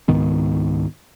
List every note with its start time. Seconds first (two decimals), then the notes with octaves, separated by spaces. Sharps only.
0.08 C#2 G#2 D#3 B3